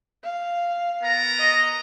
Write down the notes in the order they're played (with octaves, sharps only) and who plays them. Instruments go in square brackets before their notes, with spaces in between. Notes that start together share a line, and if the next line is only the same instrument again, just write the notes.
[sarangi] F5
[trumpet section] B3 A#4 A#5
[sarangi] D#5